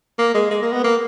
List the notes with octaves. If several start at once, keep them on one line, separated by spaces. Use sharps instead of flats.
A#3
G#3
G#3
A#3
B3
A#3